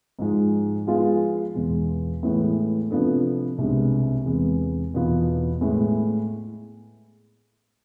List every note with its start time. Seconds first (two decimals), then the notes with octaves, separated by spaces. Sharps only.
0.19 G#2 F3 G#3
0.87 F3 G#3 B3 F4 G#4
1.55 E2 B2 G#3 B3
2.23 A2 E3 G#3 B3
2.91 C3 F3 B3 D4 A4
3.58 C2 B2 G#3 B3 D4
4.26 E2 C3 G#3 B3
4.94 E2 B2 B3 F4
5.61 A2 G#3 B3 E4